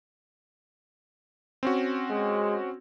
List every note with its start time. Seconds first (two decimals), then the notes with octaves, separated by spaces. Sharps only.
1.63 C4 C#4 F#4
2.10 G#3